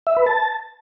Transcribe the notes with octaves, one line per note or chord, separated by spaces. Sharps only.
E5
B4
A5